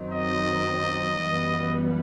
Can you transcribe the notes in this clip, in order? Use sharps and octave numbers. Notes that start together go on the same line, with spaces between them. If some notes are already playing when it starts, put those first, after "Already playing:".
Already playing: F#2 D#3 F#3 C4 D#4
D#5
F#2 E3 G3 B3